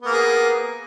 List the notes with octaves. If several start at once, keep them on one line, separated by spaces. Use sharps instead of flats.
A#3 B3 G#4